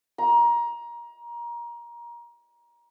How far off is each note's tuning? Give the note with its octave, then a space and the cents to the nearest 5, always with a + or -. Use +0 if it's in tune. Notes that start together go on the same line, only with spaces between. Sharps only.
A#5 +25